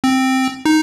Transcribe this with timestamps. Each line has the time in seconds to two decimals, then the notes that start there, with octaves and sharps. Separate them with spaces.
0.04 C4
0.65 D#4